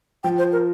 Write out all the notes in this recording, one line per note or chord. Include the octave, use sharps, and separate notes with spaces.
F3 G5
C5
A#4